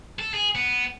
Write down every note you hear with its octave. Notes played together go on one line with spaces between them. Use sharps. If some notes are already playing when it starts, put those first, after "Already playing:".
A4
G#4
B3